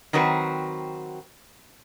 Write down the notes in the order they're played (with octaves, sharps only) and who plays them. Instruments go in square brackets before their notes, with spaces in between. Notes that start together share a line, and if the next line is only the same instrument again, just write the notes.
[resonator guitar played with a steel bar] D#3 F#3 C4 F#4 B4